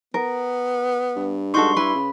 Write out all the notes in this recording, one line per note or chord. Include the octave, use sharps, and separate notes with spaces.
B3 A#4
G2
G#3 D#4 F#4 A4 C6 C#6
E4 B4 B5
C#3